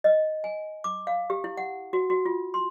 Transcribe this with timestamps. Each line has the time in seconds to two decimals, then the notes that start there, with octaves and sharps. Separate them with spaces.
0.04 D#5
0.44 G#5
0.84 D6
1.07 F5
1.30 G4
1.44 E4
1.57 F#5
1.93 F#4
2.10 F#4
2.26 F4
2.54 C6